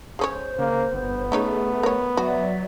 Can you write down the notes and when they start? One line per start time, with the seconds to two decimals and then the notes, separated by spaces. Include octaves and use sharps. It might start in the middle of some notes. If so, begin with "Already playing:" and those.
0.19 G#3 C#4 C5 C#5
0.59 C#3 A#3
0.93 G1 B3
1.32 A3 C#4 D#4 G#4 C#5
1.83 A#4 C#5
2.17 F#3 F#4 D5 E5